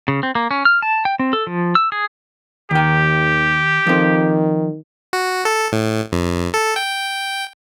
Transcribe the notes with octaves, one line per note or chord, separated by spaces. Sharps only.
C#3
C4
A#3
C#4
F6
A5
G5
C4
A4
F3
E6
G#4
D#2 D#3 G4 G5
D#3 F3 C4
F#4
A4
A2
F2
A4
G5